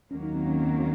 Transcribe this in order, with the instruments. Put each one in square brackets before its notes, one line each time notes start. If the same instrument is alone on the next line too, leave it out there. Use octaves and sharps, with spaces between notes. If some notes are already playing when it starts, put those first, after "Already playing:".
[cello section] D#2 D#3 F#3 A#3 [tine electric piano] C#4
[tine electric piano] D#4
C4
C#4
C4